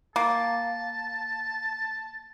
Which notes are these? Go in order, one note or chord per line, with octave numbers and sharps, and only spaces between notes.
A#3 A5